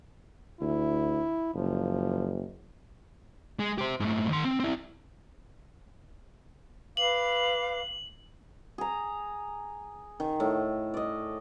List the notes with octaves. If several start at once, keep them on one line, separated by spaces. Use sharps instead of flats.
D2 E4
F#1 F3
G#3
G4 C5
G#2 A3
D#3 C6
C4
C4 E4
B4 F5 D6 F#7
G#4 A#5
D#3
A2
D5 D#5